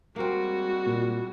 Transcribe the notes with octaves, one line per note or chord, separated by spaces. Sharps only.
G3 G#3 A#3 C4 F#4
A#2